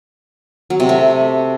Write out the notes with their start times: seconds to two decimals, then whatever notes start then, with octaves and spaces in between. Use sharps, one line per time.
0.70 F#3
0.80 C3
0.89 A3